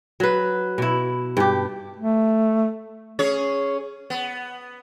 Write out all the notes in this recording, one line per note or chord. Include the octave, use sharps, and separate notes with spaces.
F#3 B4
B2 E4
G2 G4
A3
C#4 G#4 C#5
B3